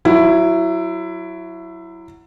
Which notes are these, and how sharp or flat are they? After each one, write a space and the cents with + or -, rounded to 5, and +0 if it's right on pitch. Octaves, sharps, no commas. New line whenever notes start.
F#3 +0 E4 +15